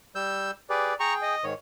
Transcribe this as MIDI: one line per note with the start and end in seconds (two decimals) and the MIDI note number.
0.15 0.51 55
0.15 0.51 88
0.15 0.51 91
0.70 0.93 67
0.70 0.93 68
0.70 0.93 71
0.70 0.95 74
1.00 1.35 68
1.00 1.35 79
1.00 1.14 82
1.00 1.14 85
1.22 1.45 75
1.44 1.54 44
1.44 1.54 51
1.44 1.54 73